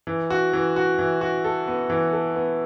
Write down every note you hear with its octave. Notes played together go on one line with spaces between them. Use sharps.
E3
F#4
E3
F#4
E3
F#4
A4
B3
E3
A4
B3